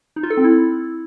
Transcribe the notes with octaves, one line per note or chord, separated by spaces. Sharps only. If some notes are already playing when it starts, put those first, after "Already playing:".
D#4
F4
A4
C4
E4